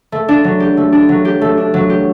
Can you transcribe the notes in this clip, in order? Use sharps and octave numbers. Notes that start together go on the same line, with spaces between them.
A3
D4
F#3
G4
A3
D4
F#3
G4
A3
D4
F#3
G4